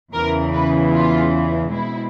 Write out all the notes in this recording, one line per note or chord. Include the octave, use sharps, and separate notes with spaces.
E2 C#3 E3 A#4
B4
F4
B2 G#3 C4 E4